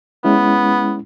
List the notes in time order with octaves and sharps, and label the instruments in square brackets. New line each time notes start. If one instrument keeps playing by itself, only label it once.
[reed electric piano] G#3 C#4 E4 [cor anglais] B3